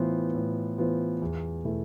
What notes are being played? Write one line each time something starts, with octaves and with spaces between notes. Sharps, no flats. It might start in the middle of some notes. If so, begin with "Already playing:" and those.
Already playing: A2 E3 B3 F4 C5
A2
E3 B3 F4 C5
E2
B2 A3 E4 A4